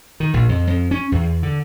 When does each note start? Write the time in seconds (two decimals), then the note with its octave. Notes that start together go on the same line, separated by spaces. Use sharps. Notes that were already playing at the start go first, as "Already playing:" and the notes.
0.20 D#3
0.34 A#1
0.49 F2
0.67 F2
0.91 C#4
1.12 E2
1.43 D3